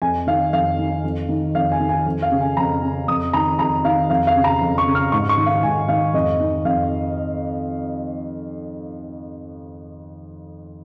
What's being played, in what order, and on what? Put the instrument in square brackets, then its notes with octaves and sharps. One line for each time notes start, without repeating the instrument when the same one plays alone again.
[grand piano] F2 G#5
D#3 F5
F2 F5
D#3
F2
D#3
F2 F5
G#5
D#3
G#5
F2
F5
C#3
G#5
F2 A#5
C#3
F2 D#6
D#3 A#5
F2 A#5
D#3 F5
F2 F5
F5
C#3
A#5
F2
C#6
C#3
F6
G#2 C#6
C#6
D#3
F5
G#2 G#5
D#3 F5
F2 D#5
D#3
F2 F5